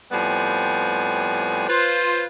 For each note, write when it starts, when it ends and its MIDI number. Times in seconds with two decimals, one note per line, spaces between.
0.12 1.66 45
0.12 1.66 53
0.12 1.66 55
0.12 1.66 59
0.12 1.66 60
0.12 1.66 80
1.69 2.24 65
1.69 2.24 71
1.69 2.24 72